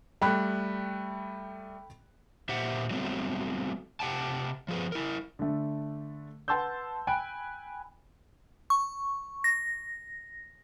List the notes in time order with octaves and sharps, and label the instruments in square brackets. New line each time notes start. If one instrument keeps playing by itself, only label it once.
[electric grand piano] G3 A3 [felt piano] G5 B5 F#6
[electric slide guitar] A#2 G4 C5 E5 F#5
F#3 G3 A3 B3 C4
C3 G4 F#5 G5 A5
F3 G#4 B4
E4 A#4
[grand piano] D3 A3
B4 F#5 A5 C6 E6 G6
G5 G#5 B5 F#6 D7
[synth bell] C#6
A#6